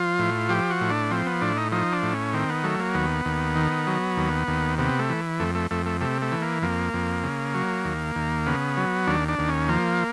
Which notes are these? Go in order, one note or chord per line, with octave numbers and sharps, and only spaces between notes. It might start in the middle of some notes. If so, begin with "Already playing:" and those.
Already playing: F3 F4
A2
F3 G4
F#4
A2
D4
F3 C4
B3
A2 D4
D#4
F3 D#4
D4
A2
C#4
D#3 C4
B3
F#3 A3
A#3
D#2 B3
D#2
D#3
F#3
D#2
D#2
C3 B3
A3
E3
F2 A3
A3
F2 A3
A3
C3 A3
A3
E3
A#3
F2 A#3
F2
C#3
F#3
D#2
D#2
C#3 B3
F#3
D#2 D4
D4
D#2
C#4
F3 A#3